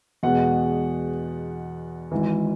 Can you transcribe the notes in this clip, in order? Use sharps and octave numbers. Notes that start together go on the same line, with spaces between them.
E2 B2 G#3 F#5
G#1 G#2 E3